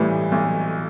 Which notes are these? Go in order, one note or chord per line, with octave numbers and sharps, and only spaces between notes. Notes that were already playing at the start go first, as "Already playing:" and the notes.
Already playing: B1 A2 E3 G3
B1